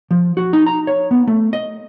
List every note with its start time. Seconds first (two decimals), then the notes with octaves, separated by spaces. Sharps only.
0.11 F3
0.37 F#4
0.53 D#4
0.66 A#5
0.87 C#5
1.11 B3
1.27 A3
1.53 D#5